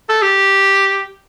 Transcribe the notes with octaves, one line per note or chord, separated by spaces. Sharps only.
A4
G4